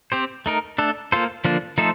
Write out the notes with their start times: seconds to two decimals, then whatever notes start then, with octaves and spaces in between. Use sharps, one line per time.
0.12 C4 G4 C5
0.46 A3 D#4 A#4
0.78 A3 D4 A4
1.12 A#3 F4 A4 C5
1.45 D3 F3 A#3 D4 F4
1.78 F3 A3 D#4 A4 C5